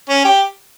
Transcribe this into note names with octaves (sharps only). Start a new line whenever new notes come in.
C#4
G4